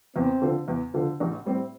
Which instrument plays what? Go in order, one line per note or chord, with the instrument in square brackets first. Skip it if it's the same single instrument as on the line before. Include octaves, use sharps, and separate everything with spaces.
[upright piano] E2 [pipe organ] C4
[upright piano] D3 F3
E2
D3 F3
A1
A2 G3 C4